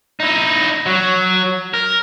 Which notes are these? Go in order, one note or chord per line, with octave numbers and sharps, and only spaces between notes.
D#4 E4
F#3
A#4